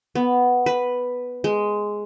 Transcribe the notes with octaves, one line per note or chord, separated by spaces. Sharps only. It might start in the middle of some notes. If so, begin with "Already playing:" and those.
B3
B4
G#3